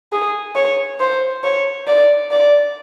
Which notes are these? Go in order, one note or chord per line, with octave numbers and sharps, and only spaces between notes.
G#4
C#5
C5
C#5
D5
D5